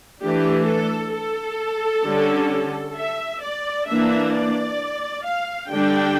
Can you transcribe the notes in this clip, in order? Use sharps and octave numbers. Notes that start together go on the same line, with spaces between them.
E3 A3 D4 G4
A4
A4
D3 G3 C#4
E5
D5
E3 A#3 D4 E5
D5
F5
D3 G3 D4 G5